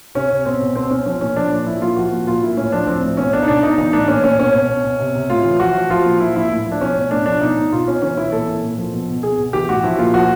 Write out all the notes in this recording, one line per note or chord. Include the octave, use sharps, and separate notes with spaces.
C3 C#4
C3
B2 C4
B2
B2 C4
B2 C#4
F3 C#4
A#2 C#4
F3 D4
A#2
F3 E4
A#2 F4
F3 F#4
A#2
A#2 F4
A#2 E4
A2 C#4
F3 D4
F3 C4
A2
B2 C#4
B2 D4
D#4
B2 D4
B2 D#4
E3 D#4
A2 D4
A#2 C#4
A#2 C#4
B2 C#4
B2
B2
B2
C3
C3
A2 F4
E3
F3 F#4
F3
F3 F4
A#2
F3 E4
A#2 E4
A2
F3
D4
B2 C#4
B2
A2 D4
F3 D4
B2 D#4
B2
B2 F4
B2 C#4
E3 C#4
E3 E4
A#2 A4
A#2
A#2
F3
B2
B2
B2 G#4
B2
E3 G4
A2 F#4
F3 E4
A#2 F4
F3 F#4